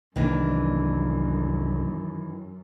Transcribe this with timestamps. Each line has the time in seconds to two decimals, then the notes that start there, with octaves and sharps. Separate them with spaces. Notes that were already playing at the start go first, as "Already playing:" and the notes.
0.16 C2 F#2 D#3 E3 A#3 D4